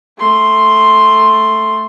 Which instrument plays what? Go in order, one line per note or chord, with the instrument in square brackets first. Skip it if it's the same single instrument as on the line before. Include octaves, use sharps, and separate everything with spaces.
[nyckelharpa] A3 C6